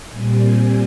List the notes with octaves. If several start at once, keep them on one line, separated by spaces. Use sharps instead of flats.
A#2 G3 C4 G#5
G#5